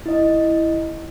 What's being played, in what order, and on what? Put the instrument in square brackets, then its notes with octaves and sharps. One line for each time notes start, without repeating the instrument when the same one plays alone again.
[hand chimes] E4 D#5